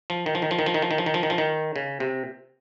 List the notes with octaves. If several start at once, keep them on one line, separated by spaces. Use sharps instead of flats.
F3
D#3
F3
D#3
F3
D#3
F3
D#3
F3
D#3
F3
D#3
F3
D#3
F3
D#3
C#3
C3